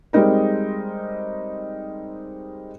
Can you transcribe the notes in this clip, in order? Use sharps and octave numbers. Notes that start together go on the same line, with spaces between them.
G3 G#3 C4 D#4 A#4